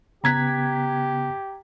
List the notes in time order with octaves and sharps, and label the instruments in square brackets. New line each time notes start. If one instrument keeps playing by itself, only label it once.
[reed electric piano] C#3 B3 F#6 [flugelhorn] G4 [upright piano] A#5 G#6 B6